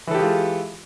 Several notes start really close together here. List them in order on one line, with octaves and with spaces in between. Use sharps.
E3 A4 G4 G#3 F4